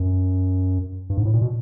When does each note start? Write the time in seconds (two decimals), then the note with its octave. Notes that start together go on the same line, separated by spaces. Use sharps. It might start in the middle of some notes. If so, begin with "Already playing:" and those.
Already playing: F#2
1.10 G2
1.17 G#2
1.25 A2
1.33 A#2
1.42 B2